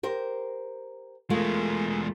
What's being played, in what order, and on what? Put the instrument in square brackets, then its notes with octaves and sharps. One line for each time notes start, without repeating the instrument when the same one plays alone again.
[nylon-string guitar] G4 A#4 C5
[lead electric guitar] E2 G#3 [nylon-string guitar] A3 F4 A#4